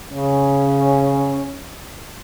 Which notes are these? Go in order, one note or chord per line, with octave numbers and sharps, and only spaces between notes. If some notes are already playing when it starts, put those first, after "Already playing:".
C#3 C#4